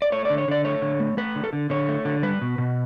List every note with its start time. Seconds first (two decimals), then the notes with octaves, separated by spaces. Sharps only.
0.02 D5
0.12 A3 C#5
0.25 D3 D5
0.38 C#5
0.48 D3 D5
0.65 A3 C#5
0.82 D3
1.00 A3
1.17 A3 B4
1.36 D3
1.44 A4
1.53 D3
1.70 D3 C#5
1.89 A3
2.05 D3
2.23 G3 B4
2.41 B2
2.58 B2